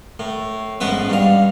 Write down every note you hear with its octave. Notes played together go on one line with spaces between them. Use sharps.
A2
A1 G#2 B3 B4
G2 F5